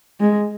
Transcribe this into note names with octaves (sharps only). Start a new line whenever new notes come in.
G#3